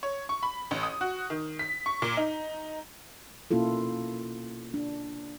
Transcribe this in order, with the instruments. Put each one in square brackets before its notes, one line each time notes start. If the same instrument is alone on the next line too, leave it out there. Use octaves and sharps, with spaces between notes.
[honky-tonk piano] C#5
C#6
B5
A1
D#6
F#4
D#3
B6
C#6
A#2
D#4
[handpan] B2 A#3 C#4 E4 F4 A4
D4